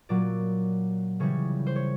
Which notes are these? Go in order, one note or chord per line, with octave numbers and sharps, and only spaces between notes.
A#2 F#3 D5
C#3 E3 G3 C#5
C5
C#5